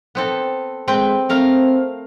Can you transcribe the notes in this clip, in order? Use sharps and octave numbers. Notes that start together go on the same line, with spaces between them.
B3 C4 A4
G#3 C4 B4 G5
A3 C4 A#4 F5